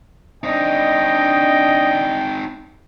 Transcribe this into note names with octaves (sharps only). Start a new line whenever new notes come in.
C4 D4 D#4 D#5 G5